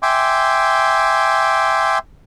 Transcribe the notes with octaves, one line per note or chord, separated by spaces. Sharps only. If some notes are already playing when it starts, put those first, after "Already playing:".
E5 G5 G#5 C6 D6